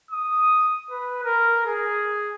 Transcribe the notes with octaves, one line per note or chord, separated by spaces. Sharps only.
D#6
B4
A#4
G#4